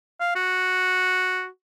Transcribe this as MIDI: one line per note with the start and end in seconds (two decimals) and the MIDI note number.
0.20 0.32 77
0.35 1.47 66